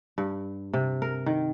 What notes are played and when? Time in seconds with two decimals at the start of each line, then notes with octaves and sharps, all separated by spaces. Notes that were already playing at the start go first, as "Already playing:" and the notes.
0.18 G2
0.74 C3
1.02 A#4
1.26 D#3